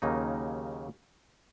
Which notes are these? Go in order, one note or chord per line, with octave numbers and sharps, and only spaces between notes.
D#2 C#3 F#3 A#3 D#4